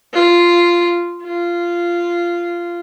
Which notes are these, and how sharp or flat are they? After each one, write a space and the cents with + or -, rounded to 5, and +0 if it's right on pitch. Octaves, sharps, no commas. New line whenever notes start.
F4 -5
F4 -10